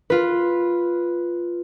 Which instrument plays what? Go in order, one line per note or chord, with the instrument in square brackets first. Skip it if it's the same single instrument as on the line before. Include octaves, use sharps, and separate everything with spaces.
[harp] F4 B4